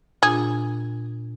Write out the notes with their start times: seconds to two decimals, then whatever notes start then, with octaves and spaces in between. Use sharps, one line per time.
0.23 A#2 D4 F4 G#4